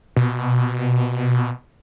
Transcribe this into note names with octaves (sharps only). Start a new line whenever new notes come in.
B2